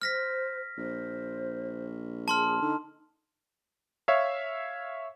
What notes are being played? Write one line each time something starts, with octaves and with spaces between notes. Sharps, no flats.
C5 F6 A#6 B6
A#1 C5
G#4 A5 C6 F6
D3 D#4
C#5 E5 F5